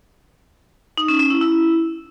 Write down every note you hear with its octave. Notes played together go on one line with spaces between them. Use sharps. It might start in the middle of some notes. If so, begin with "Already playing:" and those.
D#4
C#4
C#4
E4
E4